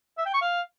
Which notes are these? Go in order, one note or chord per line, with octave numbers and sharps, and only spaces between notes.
E5
G5
C#6
F5